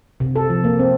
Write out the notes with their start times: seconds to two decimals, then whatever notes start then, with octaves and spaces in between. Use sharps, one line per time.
0.20 C3
0.36 A4
0.50 F3
0.64 A#3
0.79 C4